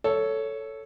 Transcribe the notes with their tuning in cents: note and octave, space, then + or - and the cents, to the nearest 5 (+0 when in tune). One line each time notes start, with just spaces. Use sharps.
A4 +0 C#5 +10